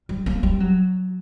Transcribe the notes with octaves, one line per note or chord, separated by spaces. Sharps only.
G3
A#3
G3
F#3